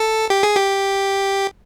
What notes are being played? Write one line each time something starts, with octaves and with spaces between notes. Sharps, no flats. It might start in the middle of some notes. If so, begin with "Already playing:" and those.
Already playing: A4
G4
G#4
G4